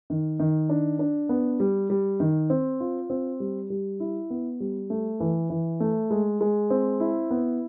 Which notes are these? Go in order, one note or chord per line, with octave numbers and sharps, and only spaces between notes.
D#3
D#3
D4
D4
B3
G3
G3
D#3
C4
F4
C4
G3
G3
E4
B3
G3
A3
E3
E3
A3
G#3
G#3
C4
E4
B3